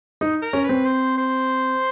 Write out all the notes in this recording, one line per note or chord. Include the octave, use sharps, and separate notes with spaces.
D#4
A#4
C#4
B4
C4
C5
C5